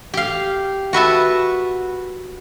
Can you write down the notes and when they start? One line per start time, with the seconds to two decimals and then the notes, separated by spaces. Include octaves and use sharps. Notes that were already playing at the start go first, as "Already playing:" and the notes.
0.14 G4 F5
0.93 F#4 B4 E5 A5